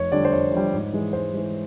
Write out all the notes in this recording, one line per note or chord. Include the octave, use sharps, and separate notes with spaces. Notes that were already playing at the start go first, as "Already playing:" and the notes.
Already playing: F1 C#5
F2 D3 G3 D5
C5
F1 C#5
F2 D3 G3
G#2
E3 G#3
G#2 C5
E3 G#3